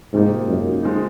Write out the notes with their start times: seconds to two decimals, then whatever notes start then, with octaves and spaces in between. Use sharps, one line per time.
0.13 G#2 C3 F3 A#3 D#4
0.48 F#2
0.83 F3 G#3 D#4